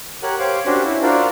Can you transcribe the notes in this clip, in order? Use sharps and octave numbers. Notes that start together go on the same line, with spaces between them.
G4 A#4 C#5 F#5 F#6
G4 C5 C#5 F5 D6
C#4 D4 F#4 G4 C5
E4
D4 F4 F#4 A#4 C5 D5